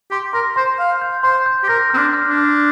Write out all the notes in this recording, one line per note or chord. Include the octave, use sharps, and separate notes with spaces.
G4 C6
A#4 C6
C5 C6
F5 G6
G6
C5 C6
G6
G4
A#4 A#6
C4 F6
D4
F6
D4
F6